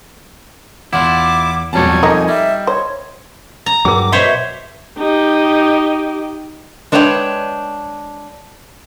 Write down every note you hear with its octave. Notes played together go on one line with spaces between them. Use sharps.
E2 E4 F4 F#5 D6
E1 F2 F#3 G3 C#5 G#5 A5
A3 A#3 D#4 D#5
G3 E5
C5 C#5
A#5
G2 F#3 G#4 A#4 D6
B2 C5 C#5 E5
D#4 G4
G#3 D4 B4 C#5 D#5 G5